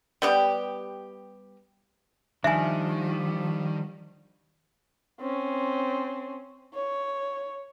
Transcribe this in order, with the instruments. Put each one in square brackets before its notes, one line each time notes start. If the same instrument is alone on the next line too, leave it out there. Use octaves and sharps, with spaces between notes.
[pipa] G3 B3 G4
[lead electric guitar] D#3 [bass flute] F3 [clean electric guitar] G3 D4 [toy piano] E5 G#5
[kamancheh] C4 C#4
C#5